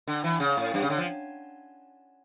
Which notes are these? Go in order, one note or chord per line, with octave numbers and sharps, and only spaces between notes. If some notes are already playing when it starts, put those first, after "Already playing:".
D3
E3
C#3
A2
G2
C#3
D3
F3